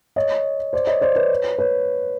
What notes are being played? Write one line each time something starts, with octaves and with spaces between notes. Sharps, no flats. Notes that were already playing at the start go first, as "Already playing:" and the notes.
C#5 D#5
C5 D5
C#5 D#5
C5 D5
B4 C#5
B4 C#5